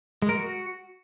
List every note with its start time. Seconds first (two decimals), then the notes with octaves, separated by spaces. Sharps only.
0.22 G#3
0.29 A#4
0.35 F#4